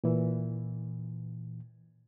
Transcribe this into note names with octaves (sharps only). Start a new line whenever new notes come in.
A#2 E3